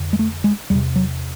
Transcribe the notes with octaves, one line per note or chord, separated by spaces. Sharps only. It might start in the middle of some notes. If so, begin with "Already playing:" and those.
Already playing: F2 D3
G#3
A3
G#3
E2 C3 G3
F#3